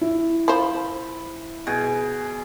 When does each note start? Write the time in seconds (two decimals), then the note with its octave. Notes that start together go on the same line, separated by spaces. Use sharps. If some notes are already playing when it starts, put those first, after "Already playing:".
0.01 E4
0.48 F3 C5 B5
1.67 B2 G#4